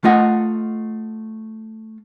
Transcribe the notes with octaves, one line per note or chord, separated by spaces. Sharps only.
A3 F4 D#5 F#5